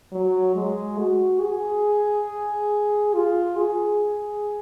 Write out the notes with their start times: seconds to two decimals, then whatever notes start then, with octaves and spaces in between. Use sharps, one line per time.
0.12 F#3
0.55 G#3
0.98 F#4
1.41 G#4
3.14 F4
3.57 G#4